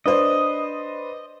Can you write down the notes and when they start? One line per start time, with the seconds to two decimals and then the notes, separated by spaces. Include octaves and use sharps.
0.06 D4 B4 C5 D#5